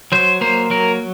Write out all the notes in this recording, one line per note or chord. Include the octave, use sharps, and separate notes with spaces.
F#3 C5
A#3 C5
F#3 A#4